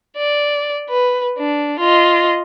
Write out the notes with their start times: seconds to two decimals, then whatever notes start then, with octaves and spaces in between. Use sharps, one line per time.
0.17 D5
0.89 B4
1.38 D4
1.79 F4 D#5